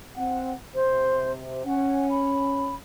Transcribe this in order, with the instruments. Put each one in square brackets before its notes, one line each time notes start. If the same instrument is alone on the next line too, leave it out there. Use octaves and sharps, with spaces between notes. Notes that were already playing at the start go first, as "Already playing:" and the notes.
[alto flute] C4 [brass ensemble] F#5
[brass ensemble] C3 [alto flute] C5
[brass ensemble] C#4 [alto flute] F#5
[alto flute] B5